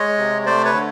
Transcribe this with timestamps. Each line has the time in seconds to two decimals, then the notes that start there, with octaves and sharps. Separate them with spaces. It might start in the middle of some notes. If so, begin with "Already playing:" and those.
Already playing: G#3 C#5 D#5
0.18 C3
0.46 A3 C5 D5
0.65 B4 C#5
0.74 D3